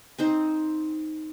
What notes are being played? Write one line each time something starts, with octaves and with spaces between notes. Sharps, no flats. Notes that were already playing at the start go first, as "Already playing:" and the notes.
C4 D#4 C5